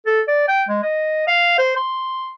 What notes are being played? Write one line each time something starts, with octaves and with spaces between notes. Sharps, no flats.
A4
D5
G5
G#3
D#5
F5
C5
C6